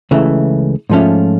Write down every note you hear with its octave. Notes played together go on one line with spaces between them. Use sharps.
C#2 C#3 E3 A3
G#2 F3 A3 C#4 F4